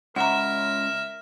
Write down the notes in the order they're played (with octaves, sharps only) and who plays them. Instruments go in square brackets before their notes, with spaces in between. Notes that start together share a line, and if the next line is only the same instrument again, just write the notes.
[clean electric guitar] C#2 [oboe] A#4 [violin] E5 [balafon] F#5 A#5